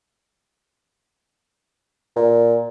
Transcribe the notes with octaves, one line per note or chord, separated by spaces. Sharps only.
A#2